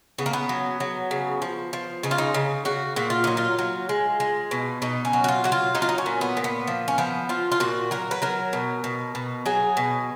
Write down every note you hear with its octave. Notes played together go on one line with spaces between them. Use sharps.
C#3 B3
A#3
B3
F#3
F#3
C#3
F3
F3
C#3 D#4
F4
D#4
C#3
C#3 F#4
A#2 F#4
F4
F#3 D#4
F4
F#3
G#3
G#3
B2
B2 D#4
C#4
F#3
F#4
F4
F#3 F#4
F4
F#3 D#4
F4
D#4
C#4
A#2
B3
A#2
B3
F3
C#4
F3 B3
F3 F4
F4
A#2 F#4
F#3 A#4
B4
F#3 A#4
B2
B2
B2
F#3 G#4
B2